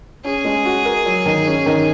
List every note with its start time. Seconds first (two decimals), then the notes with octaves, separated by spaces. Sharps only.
0.24 C#4 G#4
0.45 G#3
0.65 F#4
0.85 A#4
1.06 F#3
1.26 D#3
1.47 C#4
1.66 D#3